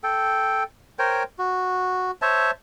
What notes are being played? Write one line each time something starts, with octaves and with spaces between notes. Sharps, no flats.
A4 G5
A#4 C5 C#5 G5
F#4
C5 C#5 E5 A5